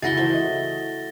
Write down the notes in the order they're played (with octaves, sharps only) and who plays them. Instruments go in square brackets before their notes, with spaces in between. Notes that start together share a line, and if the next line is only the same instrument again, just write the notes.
[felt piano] C#2 E5 [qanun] E4 F#4 G#4 [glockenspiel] A6 A#6 G7
[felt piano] E3 C5 [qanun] A3 E5
[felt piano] D#5